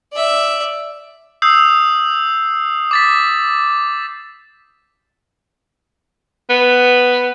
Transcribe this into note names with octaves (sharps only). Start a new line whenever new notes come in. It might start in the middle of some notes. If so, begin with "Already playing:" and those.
D5 E5
D#6 E6 G6 C7
D6 A6 B6
B3